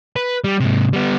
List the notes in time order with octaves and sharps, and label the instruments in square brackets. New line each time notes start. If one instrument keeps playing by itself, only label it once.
[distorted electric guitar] B4
G3
G#2 C3
G3 B3